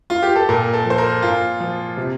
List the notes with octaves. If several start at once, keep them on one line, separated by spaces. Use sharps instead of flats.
F4
G4
A4
A#2 A#4
A4
F3 C5
A#4
A#2 F4
F3
C3